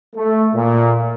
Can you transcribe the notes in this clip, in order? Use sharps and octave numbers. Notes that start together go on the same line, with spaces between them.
A3
A#2